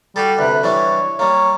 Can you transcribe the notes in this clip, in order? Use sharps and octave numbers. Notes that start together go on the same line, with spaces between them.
G3 F#4 G4 A4
D2 C3 B4
E3 G3 D4 C#5
G3 A#3 C#5